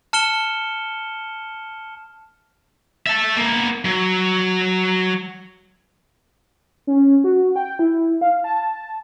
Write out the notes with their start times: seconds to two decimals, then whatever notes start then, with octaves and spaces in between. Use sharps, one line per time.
0.13 A5 F6 C#7 E7 G7
3.07 E5 A5
3.37 A#3 B3
3.85 F#3
6.87 C#4
7.24 F#4
7.56 G5
7.79 E4
8.21 F5
8.44 A5